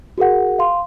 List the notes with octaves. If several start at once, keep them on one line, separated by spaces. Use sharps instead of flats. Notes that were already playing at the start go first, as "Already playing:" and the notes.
F#4 G#4 A#4 F#5
F5 C6